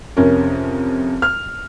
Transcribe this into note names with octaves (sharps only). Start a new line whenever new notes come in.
F2 C3 C#4 A#4
F6